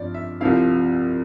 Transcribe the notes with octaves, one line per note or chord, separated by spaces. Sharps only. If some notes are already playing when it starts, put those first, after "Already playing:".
Already playing: G2 F3 C4 D5
E5
C2 C3 F3 C4 E4 F5